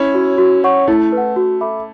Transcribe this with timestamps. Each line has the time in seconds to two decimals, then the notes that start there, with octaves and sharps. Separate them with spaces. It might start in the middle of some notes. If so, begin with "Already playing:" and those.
Already playing: C#4 E4
0.14 F#4 C#5
0.38 F#4
0.64 C#5 F#5 C#6
0.88 A3 E4
1.12 B4
1.17 F#5
1.36 F#4
1.61 A4 E5 B5 D6